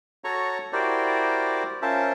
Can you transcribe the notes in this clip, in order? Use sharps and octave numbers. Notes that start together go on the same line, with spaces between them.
F#4 A4 C#5 A#5 C#6
E4 F#4 G4 A#4 C5 D5
C#4 F4 A#4 C5 E5 A5